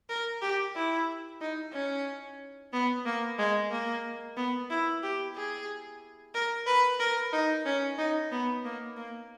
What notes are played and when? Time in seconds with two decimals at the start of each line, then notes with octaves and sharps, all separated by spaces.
0.09 A#4
0.42 G4
0.75 E4
1.41 D#4
1.73 C#4
2.73 B3
3.06 A#3
3.39 G#3
3.71 A#3
4.37 B3
4.70 E4
5.03 G4
5.36 G#4
6.34 A#4
6.67 B4
6.99 A#4
7.33 D#4
7.65 C#4
7.98 D#4
8.31 B3
8.64 A#3
8.97 A#3